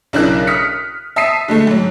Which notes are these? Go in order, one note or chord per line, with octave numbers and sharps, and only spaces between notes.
B1 C#3 D4 E4 A#4 F#6
D#6 F6 B6 C#7
E5 A5 D#6 B6 C7 D#7
D3 G#3 A3
G#2 F#3